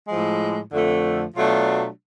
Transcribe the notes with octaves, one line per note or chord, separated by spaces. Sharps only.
A2 F3 G#3
F2 D3 F3 A3
B2 F#3 A3 D4 F4